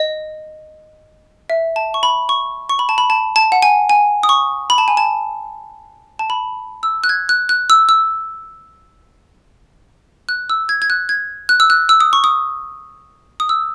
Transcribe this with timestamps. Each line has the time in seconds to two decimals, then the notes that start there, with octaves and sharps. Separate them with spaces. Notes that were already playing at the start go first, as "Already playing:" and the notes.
Already playing: D#5
1.50 E5
1.76 A5
1.94 C#6
2.03 B5
2.29 C#6
2.69 C#6
2.79 B5
2.89 A5
2.98 B5
3.10 A5
3.36 A5
3.52 F#5
3.62 G#5
3.89 G#5
4.23 D#6
4.29 C#6
4.70 B5
4.78 A5
4.88 G#5
4.97 A5
6.19 A5
6.30 B5
6.83 E6
7.04 F#6
7.09 G#6
7.29 F#6
7.49 F#6
7.70 E6
7.89 E6
10.29 F#6
10.50 E6
10.69 G#6
10.82 G#6
10.90 F#6
11.09 G#6
11.49 F#6
11.60 E6
11.70 F#6
11.89 E6
12.01 D#6
12.13 C#6
12.24 D#6
13.40 D#6
13.49 E6